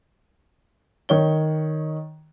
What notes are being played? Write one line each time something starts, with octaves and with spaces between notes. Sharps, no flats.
D#3 C#5 G7